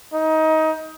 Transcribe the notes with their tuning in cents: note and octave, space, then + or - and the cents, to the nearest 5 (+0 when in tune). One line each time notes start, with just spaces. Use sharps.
D#4 +20